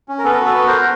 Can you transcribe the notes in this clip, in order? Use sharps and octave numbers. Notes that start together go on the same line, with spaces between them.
C#4
A#4
B3 A4 B4
F#4
A4 B4
B3
A#4 C5
F#4